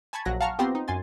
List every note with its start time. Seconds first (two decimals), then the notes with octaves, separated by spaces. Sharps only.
0.13 G#5 A5 B5 C#6 G#6
0.25 A#1 F#3 F#6 A#6
0.41 F5 F#5 A5 A#5 C#6 F6
0.59 B3 C4 F4 G4 C6 A#6
0.75 D#4
0.88 F#2 G#5 C6 A6